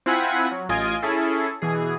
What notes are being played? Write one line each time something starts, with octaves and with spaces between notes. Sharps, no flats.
C4 E4 F4 F#5 G#5 B5
F#3
A1 F4 D#5 G#5 G#6 D7
C#4 E4 G#4 A4
B2 E3 G#4